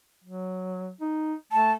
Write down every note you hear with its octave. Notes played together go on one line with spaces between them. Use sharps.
F#3
D#4
A3 A5